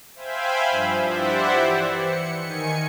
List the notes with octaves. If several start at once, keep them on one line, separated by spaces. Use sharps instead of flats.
C5 E5 F5 G5 G#5 B5
G2 F3
E4 G4 C5 D5 E5 F#5
E3
C#7
D#3 G#5 C#7